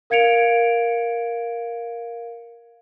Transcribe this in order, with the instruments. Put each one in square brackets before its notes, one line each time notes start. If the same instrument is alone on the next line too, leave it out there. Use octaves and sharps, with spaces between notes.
[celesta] A#4 F5 G#6 C#7 D7 F7